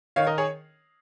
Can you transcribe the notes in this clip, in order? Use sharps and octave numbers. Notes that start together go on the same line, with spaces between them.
D#3 C#5 F5
A#4 D#5
G#4 C#5